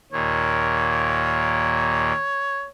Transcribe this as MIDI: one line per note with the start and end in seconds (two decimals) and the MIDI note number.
0.12 2.12 39
0.12 2.12 46
0.12 2.67 73